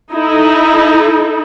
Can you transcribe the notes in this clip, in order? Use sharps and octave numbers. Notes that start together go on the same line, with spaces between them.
D#4 E4 A4